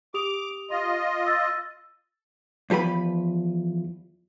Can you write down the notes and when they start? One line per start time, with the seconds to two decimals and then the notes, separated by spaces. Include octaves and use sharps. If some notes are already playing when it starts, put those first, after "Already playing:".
0.14 G4 D6 D#6 F7
0.70 F4 D#5 C6
1.27 E6 A6
2.70 E2 F3 G4 B4 B5